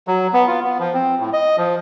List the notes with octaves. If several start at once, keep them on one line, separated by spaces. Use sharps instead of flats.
F#3
B3
F4
B3
F3
C4
A2
D#5
F3